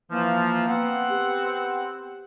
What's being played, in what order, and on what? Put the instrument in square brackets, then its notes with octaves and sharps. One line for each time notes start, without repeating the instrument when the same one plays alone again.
[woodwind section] E3 F3 [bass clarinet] A#3
[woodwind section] B3 C4 F#5
[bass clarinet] G4